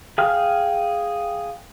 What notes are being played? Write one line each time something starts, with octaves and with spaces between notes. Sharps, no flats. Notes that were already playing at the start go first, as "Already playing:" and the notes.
G#4 F5 G5 F6